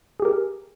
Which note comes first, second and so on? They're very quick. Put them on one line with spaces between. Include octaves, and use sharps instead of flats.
G#4 G4 A#4